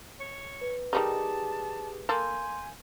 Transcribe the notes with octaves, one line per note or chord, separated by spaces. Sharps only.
C#5
B4
D#3 G3 D#4 G4 G#4 A5
A#3 A4 G#5 C6 G6